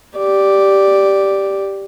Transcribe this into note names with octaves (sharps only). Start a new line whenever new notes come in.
G4 D5